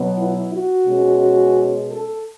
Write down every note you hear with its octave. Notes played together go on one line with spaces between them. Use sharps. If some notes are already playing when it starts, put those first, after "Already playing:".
Already playing: B2 F#3 B3
E4
F#4
B2 G#3 C#4
A4